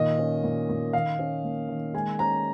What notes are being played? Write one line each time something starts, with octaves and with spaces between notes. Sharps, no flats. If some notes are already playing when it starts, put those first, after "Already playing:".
Already playing: A#2 D#3 D#5
C#4
A#2
A#2
D#3 F5
C#4
A#3
D#3
G#3 G#5
C#4 A#5